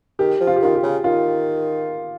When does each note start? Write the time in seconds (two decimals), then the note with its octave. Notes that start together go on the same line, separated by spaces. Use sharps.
0.19 D#3 G4
0.40 F3
0.47 F4
0.56 G4
0.62 D#3 F4
0.75 G4
0.83 C#3
1.04 D#3 F4